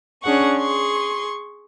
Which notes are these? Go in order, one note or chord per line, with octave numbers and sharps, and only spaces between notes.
C#4 D4 G#4 F#5 C#6
G#4 C6 C#6